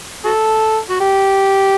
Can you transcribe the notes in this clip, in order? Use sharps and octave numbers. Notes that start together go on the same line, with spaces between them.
F#4 A4
F#4
G4